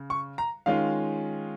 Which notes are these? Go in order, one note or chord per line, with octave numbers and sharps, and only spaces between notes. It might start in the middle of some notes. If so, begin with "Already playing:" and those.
Already playing: C#3
C#6
A#5
D#3 G#3 C#4 F4 F5